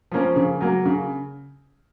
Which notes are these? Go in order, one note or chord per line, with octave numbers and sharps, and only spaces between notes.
F3 A#3 C#4
C#3
F#3 A#3
C#3